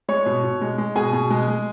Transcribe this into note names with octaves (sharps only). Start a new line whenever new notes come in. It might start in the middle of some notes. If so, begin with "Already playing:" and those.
G#3 C#5 C#6
B2
B2
G#3
G#3
B2 G#4 G#5
B2
G#3
G#3